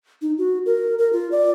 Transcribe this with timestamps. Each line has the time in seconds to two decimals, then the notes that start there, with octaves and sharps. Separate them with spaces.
0.22 D#4
0.38 F#4
0.66 A#4
0.99 A#4
1.13 F4
1.32 D5